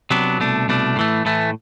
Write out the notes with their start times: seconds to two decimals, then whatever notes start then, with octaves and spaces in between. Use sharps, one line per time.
0.11 C3 F#3 B3 D4
0.39 C2 B2 A3 D4
0.68 C2 B2 A3 D4
0.96 A2 E3 A3
1.25 A2 E3 A3